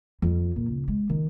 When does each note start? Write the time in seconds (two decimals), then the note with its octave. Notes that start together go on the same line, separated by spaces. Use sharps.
0.22 F2
0.56 A#2
0.68 C#2
0.88 G#3
1.09 D#3